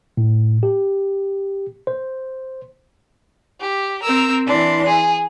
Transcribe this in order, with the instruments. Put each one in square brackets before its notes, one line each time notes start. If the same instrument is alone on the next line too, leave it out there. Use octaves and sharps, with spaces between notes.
[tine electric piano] A2
G4
C5
[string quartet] G4
C4 A#4 E6
E3 D4 C6
G#4